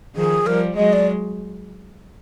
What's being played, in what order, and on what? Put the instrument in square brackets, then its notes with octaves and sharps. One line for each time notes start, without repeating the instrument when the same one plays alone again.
[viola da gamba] D#3 F3 [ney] G#4
[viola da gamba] F3 G3 [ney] A#4
[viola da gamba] F#3 G#3 [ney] D#5
[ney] D5